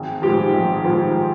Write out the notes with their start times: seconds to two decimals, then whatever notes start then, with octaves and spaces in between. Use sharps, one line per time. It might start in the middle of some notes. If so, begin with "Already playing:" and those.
Already playing: G#1
0.22 G#2 F3 G4
0.54 G#1
0.84 G#2 F3